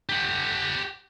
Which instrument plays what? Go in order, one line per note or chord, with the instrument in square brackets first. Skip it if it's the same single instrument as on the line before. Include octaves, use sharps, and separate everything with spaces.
[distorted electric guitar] G4 F#5